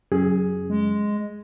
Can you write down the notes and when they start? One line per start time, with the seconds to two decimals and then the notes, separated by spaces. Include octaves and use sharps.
0.12 F#2 C#3 G#4
0.70 G#3